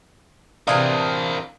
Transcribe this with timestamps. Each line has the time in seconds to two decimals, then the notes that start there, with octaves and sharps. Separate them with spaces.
0.67 C3 E3 D4 A#4 C5 F5 D#6